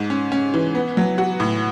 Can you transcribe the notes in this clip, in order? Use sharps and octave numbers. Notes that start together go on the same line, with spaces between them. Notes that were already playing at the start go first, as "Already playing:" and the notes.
Already playing: G#2
C#4
C#4
E3
B3
F#3
F#4
A2